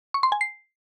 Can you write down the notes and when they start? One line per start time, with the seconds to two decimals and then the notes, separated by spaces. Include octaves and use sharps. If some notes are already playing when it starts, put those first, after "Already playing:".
0.14 C#6
0.23 C6
0.32 G#5
0.41 C7